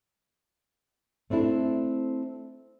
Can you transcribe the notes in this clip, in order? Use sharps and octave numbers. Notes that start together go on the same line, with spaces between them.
A3 C4 D4 E4 A4